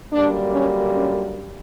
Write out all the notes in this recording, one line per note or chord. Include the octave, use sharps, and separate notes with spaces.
F#2 D3 G3 A#3 D4
C#4
C#4